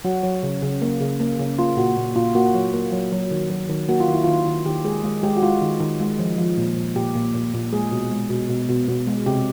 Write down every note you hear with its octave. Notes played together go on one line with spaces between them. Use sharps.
F#3 F#4
F#3
C#3
C#3
A#3
C#3
A#3
C#3
A#3 F4
A#2 F#4
A#2
A#2 F4
A#3 F#4
F#3
A#3
F#3
F#3
D#3
F#3
D#3
A#3 F#4
F4
D#3 E4
D#3 F4
D#3
D#3 G4
G#3 G#4
G#3
G#3 G4
F#4
G#3 F4
D#3
D#3
G#3
F3
F3
A#2
A#2
A#2 G4
A#2
A#2
A#2
G#3 G#4
B2
G#3
B2
B2
B2
B2
G#3
C3 G4